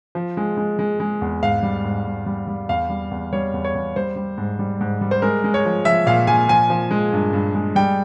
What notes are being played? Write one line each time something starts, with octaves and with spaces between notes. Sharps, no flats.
F3
G#3
G#3
G#3
G#3
E2
G#2 F5
G3
G#2
G#2
G3
G3
E2 F5
G3
E2
G3 C#5
E2
C#5
E2
G3 C5
G3
G#2
G3
G#2
G3
C5
G#3 A#4
G#3
C#5
F3
F3 E5
A#2 F5
A#2 G#5
F3 G#5
F3
G#3
G2
G2
G#3
G3 G5